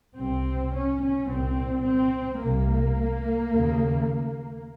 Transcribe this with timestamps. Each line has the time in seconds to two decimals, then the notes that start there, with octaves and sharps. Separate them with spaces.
0.17 C2 C3 C4
0.73 C#4
1.01 C#4
1.29 C2 A#2 C4
1.85 C4
2.41 C2 C3 A#3
3.54 D#2 C#3